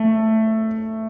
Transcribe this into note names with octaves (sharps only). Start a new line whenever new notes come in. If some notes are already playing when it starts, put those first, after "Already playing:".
Already playing: A3